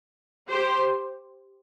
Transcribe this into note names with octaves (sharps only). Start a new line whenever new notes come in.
G4 C5